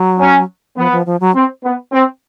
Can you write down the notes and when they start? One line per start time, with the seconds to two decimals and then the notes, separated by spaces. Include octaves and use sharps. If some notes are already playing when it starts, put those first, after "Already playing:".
Already playing: F#3
0.20 C#4
0.77 F3 B3
0.92 F3
1.06 F3
1.21 F#3
1.34 C4
1.64 B3
1.92 C4